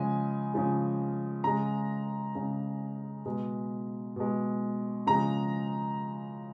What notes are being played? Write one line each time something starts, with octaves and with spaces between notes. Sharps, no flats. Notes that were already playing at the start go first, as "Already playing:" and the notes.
Already playing: C#3 F3 G#3 G#5
C#3 F3 G#3
C#3 G#3 A#5
C#3 G#3
B2 G#3
B2 G#3
C#3 F3 G#3 A#5